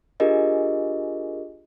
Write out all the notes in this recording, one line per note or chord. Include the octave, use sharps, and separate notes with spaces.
D4 F4 G4 G#4 A#4 D#5